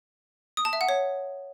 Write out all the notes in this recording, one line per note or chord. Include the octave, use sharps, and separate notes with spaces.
D#6
A5
E5
F#5
C#5